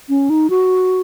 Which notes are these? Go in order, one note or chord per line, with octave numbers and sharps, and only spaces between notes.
C#4
D#4
F#4